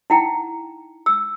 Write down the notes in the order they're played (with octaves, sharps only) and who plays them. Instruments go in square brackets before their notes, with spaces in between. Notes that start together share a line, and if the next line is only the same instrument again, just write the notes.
[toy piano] D#4 E4 F#5 G5 A#5
E6